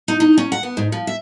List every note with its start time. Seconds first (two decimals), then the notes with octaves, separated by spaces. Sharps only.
0.08 D#4
0.20 D#4
0.38 C#4
0.52 F#5
0.63 B3
0.77 G#2
0.92 F3
1.07 E5